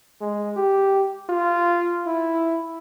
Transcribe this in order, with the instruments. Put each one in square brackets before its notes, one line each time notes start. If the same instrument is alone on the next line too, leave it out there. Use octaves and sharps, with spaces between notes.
[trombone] G#3
G4
F4
E4